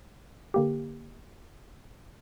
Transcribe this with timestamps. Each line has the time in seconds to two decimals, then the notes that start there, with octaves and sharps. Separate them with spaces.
0.54 D3 A#3 G4